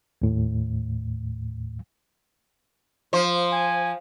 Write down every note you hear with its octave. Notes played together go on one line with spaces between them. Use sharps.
D#2 A2
F3 C5
G#5